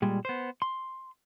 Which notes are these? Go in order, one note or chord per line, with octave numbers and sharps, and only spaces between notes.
A#2 G3 G#3
B3 C5
C6